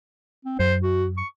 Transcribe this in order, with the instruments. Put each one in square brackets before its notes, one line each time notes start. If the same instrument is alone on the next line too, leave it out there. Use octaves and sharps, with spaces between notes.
[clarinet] C4
[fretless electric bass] F#2 [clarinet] C5
[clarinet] F#4
C#6